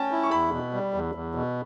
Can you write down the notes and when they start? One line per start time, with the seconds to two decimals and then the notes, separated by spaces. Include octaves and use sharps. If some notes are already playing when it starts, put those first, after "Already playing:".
Already playing: C#4 G5 A5
0.11 E4
0.23 C#6
0.31 E2 B5
0.52 B2
0.73 G3
0.94 E2
1.15 E2
1.35 B2